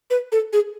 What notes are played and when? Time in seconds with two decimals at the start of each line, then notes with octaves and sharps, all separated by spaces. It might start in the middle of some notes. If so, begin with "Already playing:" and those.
0.10 B4
0.32 A4
0.53 G#4